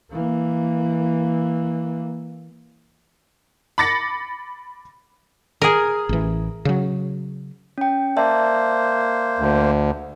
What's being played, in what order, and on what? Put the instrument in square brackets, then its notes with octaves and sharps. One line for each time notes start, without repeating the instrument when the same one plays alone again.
[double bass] E3 A#3
[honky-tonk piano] B5 D6 A6 A#6 C#7
[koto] G#4 A#4
[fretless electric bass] A1 E3
C#3 F#3
[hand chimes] C#4 G5
[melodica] A#3 C5 [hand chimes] D5 E5 A5
[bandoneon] D2